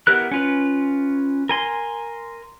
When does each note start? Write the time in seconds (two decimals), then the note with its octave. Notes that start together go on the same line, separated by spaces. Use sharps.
0.07 B3 E4 G4 A#4 F#6
0.31 C#4 F4 B4
1.49 A#4 G#5 C6